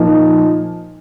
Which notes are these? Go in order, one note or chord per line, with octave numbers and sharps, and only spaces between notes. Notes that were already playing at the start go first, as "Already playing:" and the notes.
Already playing: A#2 F3 A#3 D#4